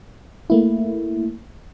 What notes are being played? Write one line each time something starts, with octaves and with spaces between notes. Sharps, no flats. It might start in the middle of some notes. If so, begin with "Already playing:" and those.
A3 A#3 E4